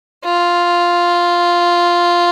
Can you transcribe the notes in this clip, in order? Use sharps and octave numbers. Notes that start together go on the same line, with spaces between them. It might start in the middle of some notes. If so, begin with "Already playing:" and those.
F4